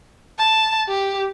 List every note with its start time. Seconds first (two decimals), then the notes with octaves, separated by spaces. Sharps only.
0.38 A5
0.88 G4